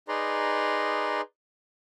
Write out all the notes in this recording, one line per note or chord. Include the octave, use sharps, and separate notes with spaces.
D#4 G#4 B4 D5 A#5 C6